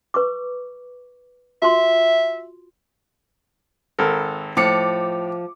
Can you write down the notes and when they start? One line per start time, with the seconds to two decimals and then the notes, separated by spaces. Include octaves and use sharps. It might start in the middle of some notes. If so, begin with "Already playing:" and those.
0.14 B4 C#6 D6
1.62 F4 F#4 E5 C6
3.99 G#1 A4 A#4
4.57 A2 F3 D6 C#7